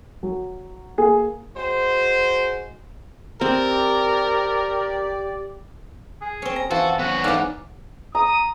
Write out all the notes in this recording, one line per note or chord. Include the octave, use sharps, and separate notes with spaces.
F#3
A#3 G#4
G#3 F#4 C5
C4 G4 A#4 D5
G#4
C4 C#4
A#5
E3 F4 F#4 A4
B3 C#4 F#4
G#2 E3 D5 F5 F#5
A#5 D#6